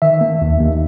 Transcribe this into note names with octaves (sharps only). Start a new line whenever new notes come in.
D#3 E5
A#3
D#2
D#2